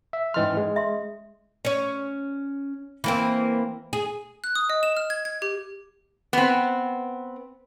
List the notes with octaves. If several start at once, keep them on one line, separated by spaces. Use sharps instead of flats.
E5
G#2 E3 C#4 D#5 C6 F6
G#3
E5 C6
C#4 C#5
E3 A#3 C4
G#4
F#6
D#6
D#5
E7
F6
G#6
G#6
G4
B3 C4